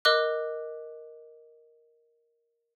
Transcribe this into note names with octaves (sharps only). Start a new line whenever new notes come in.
A#4 D#5 D6 F#6